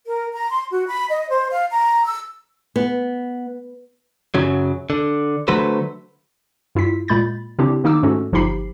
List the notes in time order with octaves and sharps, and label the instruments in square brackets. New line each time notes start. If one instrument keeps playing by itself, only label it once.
[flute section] A#4
A#5
C6
F#4
B5
D#5
C5
F5
A#5
E6
[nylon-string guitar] B3
[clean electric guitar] F#2 C#3 F#3
D3
D3 F#3 A3 B4 C5
[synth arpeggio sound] G2 E4 F4 B6
A#2 G#3 B5 G6 A6
C#3 C4 D4 E4 G4
D#3 A#3 D#4 D6 E6
G#2 A3 C#4 F#4 A4
G1 F3 D#4 G4 B5 C7